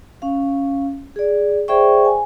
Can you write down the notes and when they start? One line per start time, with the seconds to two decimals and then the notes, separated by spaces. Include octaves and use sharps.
0.22 C#4 F5
1.16 G#4 D5
1.68 G#4 C5 D5 E5 G5 C#6
2.05 G#5